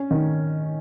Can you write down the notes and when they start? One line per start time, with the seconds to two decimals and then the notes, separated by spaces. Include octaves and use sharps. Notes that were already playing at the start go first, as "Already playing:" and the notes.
Already playing: C#4
0.11 D#3